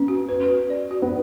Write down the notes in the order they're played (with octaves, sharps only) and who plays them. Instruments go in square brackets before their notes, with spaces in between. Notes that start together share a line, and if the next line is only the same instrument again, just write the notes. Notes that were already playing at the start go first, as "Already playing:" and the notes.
Already playing: [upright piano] B3 [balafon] C#4
[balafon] F#4
B4
F#4
D5
F#4
[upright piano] B3